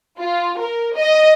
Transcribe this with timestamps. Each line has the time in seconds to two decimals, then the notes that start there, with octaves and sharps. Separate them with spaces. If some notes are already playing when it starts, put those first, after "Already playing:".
0.20 F4
0.60 A#4
0.98 D#5